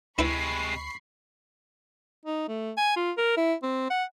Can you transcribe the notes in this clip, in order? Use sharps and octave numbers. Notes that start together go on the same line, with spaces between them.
D2 C3 G#3 E4 B4 B5 C#6 C7
D#4
A3
G#5
F4
A#4
E4
C4
F#5